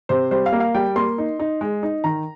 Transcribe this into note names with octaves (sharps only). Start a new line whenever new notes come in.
C3 C5
G3 C5
F5
A#3
F5
G3 G5
A#3 C6
D#4
D#4
G#3
D#4
D#3 A#5